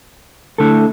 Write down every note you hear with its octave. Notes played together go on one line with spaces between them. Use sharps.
D3 A3 E4 A4